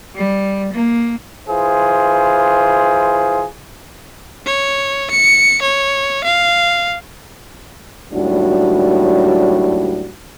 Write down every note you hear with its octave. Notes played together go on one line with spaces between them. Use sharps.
G3
A#3
E3 F4 G#4 C5
C#5
C#7
C#5
F5
D#2 A2 F#3 G3 D4 F#4